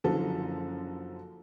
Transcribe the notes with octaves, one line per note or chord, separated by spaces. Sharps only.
F#1 F#2 D3 F3 F#4 A4